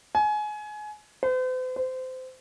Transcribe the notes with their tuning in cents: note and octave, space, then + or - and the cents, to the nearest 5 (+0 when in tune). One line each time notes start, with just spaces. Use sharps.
G#5 +25
C5 -45
C5 -25